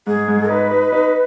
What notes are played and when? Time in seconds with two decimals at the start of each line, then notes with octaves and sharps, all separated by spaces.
0.07 G#2 G#4
0.28 G#2
0.49 D#4 B4
0.71 D#4
0.92 D#4